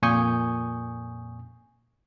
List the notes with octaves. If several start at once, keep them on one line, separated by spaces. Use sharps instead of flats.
F2 A#2 G#5 C#6 D#6 G6